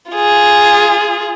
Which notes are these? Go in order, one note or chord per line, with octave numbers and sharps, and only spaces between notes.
F4 G#4